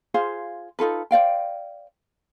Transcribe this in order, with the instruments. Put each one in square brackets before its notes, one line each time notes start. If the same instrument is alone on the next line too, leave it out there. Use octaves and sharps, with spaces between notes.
[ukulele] F4 G#4 C5 F5
D#4 F4 A4 B4
C5 D5 F5 G5